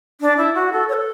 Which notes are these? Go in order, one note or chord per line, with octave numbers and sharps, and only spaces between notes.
D4
E4
F#4
A4
C#5
A4